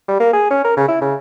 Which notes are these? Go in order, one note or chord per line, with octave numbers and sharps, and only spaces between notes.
G3
A#3
G#4
C#4
A#4
C#3
E4
C#3